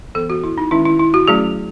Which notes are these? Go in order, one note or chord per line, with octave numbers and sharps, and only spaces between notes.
E3 B3 A4
F#4
E4
D#4
D#3 G#3 C#4 E4
E4
E4
F#4
F#3 A3 C#4 G#4